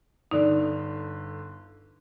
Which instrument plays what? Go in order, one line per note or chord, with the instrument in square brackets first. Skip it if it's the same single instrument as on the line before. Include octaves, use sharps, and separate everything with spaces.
[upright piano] G1 D3 [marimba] D#4 D5